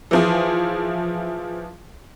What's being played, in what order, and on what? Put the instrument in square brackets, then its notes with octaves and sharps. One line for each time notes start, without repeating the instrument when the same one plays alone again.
[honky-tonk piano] E3 F3 G#4